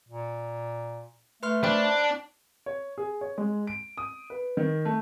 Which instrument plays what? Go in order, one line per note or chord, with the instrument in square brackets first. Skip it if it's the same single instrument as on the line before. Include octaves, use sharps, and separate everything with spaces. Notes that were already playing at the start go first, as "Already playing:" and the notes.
[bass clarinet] A#2
[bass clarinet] A3 [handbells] B4 C6 F6
[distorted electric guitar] D4 [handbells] C5 G5 B5
[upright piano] C#5
G#4
C#5
G#3
D7
D#6
B4
D#3
A3